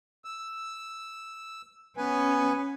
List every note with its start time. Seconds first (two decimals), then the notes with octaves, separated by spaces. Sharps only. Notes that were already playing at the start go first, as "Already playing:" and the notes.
0.25 E6
1.97 B3 C#4 B4 G#5